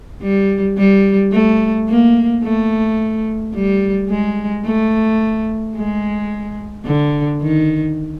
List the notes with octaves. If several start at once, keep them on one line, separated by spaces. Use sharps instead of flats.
G3
G3
A3
A#3
A3
G3
G#3
A3
G#3
D3
D#3